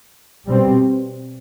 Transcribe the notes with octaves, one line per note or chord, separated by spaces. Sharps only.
B2 G3 C4